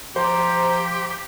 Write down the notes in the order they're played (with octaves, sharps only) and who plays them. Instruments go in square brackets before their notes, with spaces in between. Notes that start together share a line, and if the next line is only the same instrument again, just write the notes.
[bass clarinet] F3 [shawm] G4 [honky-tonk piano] C5 [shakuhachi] A#5